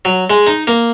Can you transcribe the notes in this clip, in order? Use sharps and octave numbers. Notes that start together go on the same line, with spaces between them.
F#3
G#3
D#4
A#3